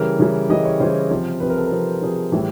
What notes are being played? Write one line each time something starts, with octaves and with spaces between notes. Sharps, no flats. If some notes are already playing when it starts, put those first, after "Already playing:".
Already playing: C#3 E3 G3 A#4
C#3 E3 G3
C#3 E3 G3 D#5
C#5
C#3 E3 G3 C5
C3 F3
C3 F3 B4
A#4
A4
A#4
C3 F3
C3 F3 G#4
A2 E3 G3